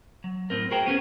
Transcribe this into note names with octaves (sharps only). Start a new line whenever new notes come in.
F#3
A2 C4 A#4
F#4 G#4 A#4 C5 G5
B3 C#4 F#4 G#4